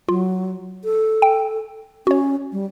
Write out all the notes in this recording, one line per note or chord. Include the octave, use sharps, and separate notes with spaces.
F#3 F4
A4
G5
C#4 F#4 C#5
G3